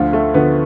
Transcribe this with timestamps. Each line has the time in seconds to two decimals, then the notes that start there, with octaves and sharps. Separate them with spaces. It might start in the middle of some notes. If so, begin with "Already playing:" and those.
Already playing: D2 D3 F3 F4
0.13 A3
0.34 D2 D3 F3 B3